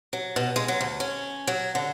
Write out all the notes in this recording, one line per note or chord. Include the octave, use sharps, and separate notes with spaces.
F#3
B2
G#3
F#3
D2
C#4
F#3
D3